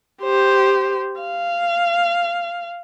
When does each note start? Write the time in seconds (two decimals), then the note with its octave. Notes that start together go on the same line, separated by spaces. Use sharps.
0.22 G4 C5
1.20 F5